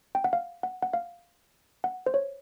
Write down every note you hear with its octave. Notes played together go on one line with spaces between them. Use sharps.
G5
F#5
F5
F#5
F#5
F5
F#5
C5
C#5